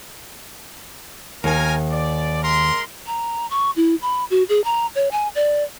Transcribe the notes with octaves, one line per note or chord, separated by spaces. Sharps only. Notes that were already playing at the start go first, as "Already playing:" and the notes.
D#2 A#4 G#5
D5
G#3 A#4 C6
A#5
C#6
E4
B5
F#4
G#4
A#5
C#5
G#5
D5